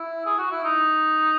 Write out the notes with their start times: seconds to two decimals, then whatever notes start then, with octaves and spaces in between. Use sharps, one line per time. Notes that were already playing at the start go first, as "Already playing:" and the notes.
Already playing: E4
0.26 G#4
0.38 F#4
0.51 E4
0.64 D#4